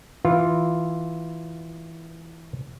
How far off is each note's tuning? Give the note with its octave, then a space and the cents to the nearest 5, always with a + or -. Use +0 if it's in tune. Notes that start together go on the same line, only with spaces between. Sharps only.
E3 -5 F4 +0